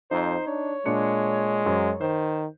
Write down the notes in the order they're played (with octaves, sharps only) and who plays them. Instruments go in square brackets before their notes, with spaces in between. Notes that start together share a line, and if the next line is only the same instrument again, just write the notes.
[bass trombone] F2 [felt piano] D#4 [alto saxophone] C5
[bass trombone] D4 [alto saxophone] C#5
[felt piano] A#2 D4 C#7 [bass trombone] G#3
[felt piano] F#2 F#3 C5
[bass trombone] D#3 [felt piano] C5